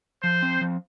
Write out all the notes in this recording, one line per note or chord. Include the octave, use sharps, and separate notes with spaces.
F3 C5
C4
F3